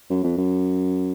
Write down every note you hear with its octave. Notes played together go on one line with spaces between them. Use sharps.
F#2
F2
F#2